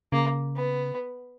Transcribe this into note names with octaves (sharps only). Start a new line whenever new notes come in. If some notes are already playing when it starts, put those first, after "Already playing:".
C#3 A#3
B3